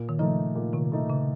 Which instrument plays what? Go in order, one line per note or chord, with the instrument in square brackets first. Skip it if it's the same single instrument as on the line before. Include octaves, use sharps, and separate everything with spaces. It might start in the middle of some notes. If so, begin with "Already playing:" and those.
Already playing: [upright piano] A#2
[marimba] D#3
[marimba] C#3 F3 [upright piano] A3 D#4
[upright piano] A#2
[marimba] C3 D#3
[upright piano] A3 D#4
[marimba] C#3